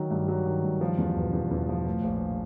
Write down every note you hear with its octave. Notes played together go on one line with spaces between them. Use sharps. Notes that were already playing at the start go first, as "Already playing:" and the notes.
Already playing: D#3 F#3
G2
F#3
D#3
G2
F3
E2
E1
E2
E2
F3
A2
A#1